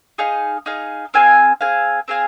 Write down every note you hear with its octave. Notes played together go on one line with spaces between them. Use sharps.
D#4 G#4 F5
D#4 G#4 F5
C4 G#4 F5 G#5
C4 G#4 F5 G#5
C4 G#4 F5 G#5